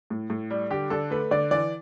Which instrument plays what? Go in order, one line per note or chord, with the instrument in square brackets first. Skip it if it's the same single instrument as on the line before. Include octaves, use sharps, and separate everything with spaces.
[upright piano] A2
A2
G3
[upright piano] D3 [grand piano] G4
[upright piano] D3 [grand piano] A4
[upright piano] A3 [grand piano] B4
[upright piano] D3 [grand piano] D5
[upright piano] E3 [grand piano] D5